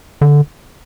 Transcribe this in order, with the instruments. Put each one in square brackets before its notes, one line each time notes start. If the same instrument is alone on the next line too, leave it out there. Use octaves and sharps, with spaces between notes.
[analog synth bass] D3